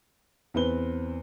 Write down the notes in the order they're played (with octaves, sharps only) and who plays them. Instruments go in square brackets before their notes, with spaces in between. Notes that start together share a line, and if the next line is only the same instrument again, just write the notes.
[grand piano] E2 C4 B4 G7